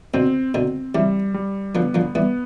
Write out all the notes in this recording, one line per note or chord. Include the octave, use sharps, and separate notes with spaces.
B2 D3 C4
B2 D3 C4
C3 E3 G3
G3
D3 F3 B3
D3 F3
E3 G3 B3